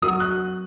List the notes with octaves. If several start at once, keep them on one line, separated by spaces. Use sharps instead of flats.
F#3 C4 F#4 A#4 D#6
F#6